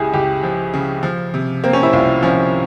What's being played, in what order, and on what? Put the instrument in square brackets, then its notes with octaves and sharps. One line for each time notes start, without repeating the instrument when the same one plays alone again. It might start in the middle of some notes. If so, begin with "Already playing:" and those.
Already playing: [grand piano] C#2 C#3 [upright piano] C#4 E4 G4 G#4
[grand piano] C#2 [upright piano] G4
[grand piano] F3
C#3
F3
C3
[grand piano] A#3 [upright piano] C4
[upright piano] C#4
E4
[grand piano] C2 [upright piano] F4
[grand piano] F3 [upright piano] C#4